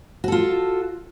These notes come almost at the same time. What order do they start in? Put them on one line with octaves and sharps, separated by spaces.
F#4 A4 F4